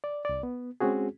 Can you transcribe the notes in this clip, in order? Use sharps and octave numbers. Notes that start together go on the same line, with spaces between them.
D5
C2 D5
B3
G#3 C4 C#4 F#4 G#4